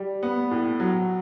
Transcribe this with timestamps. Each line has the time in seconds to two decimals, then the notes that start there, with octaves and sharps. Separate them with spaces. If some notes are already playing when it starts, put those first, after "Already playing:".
Already playing: G3
0.23 B3
0.51 A2
0.80 F#3